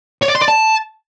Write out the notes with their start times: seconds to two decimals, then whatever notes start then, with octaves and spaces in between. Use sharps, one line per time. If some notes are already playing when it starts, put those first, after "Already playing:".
0.22 C#5
0.28 D5
0.35 C6
0.41 D5
0.48 A5